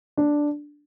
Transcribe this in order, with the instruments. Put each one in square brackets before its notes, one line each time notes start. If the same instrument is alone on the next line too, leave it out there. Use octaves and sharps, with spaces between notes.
[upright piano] D4